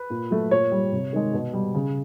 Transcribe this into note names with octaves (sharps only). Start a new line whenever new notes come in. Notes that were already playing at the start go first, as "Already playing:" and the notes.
Already playing: B4
A#2
F#3 A3
A#2 C#5
G3
C3
D#3 G#3
B2
G3
C#3